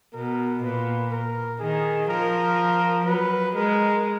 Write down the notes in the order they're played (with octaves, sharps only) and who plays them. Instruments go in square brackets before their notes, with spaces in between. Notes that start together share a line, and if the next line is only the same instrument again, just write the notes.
[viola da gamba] B2 [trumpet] A#4
[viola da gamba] A#2 [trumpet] B4
[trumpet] A#4
[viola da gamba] D#3 [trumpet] G#4
[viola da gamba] F3 [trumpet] A#4
[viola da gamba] F#3 [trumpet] B4
[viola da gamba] G#3 [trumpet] A#4